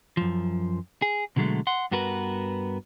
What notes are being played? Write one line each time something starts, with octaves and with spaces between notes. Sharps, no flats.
F#2 F3
G#4
B2 D3 F#3 G#3 A3
F#5 C6
G2 B3 F#4 A#4 B4